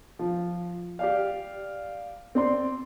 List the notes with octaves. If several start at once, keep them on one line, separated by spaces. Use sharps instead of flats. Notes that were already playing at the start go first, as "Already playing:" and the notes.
F3
G4 D5 F5
C4 D5 C6